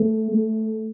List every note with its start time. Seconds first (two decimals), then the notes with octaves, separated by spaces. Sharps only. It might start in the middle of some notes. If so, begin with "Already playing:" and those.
Already playing: A3
0.32 A3